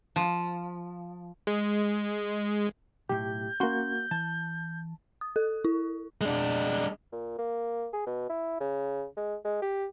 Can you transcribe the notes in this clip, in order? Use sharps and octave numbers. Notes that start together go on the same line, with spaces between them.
F3
G#3
B1 A2 G4 G6
A#3 C#4 F#4 C6
E3 A5
D#6
A4
E4
G#3 D4
A#2
A#3
G#4
B2
E4
C#3
G#3
G#3
G4